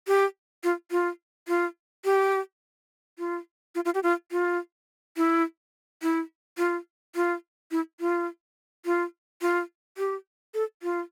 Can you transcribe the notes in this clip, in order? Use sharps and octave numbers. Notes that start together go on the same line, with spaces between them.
G4
F4
F4
F4
G4
F4
F4
F4
G4
F4
F4
E4
E4
F4
F4
E4
F4
F4
F4
G4
A4
F4